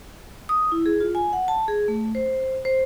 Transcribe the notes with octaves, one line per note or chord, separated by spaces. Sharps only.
D#6
E4
G#4
F4
G#5
F#5
A5
G#4
A3
C5
C5